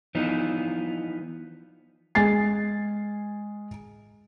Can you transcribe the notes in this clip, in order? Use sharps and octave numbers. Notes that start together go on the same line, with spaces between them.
E3 F3 B3 D#4
G#3 G#5 A6 C7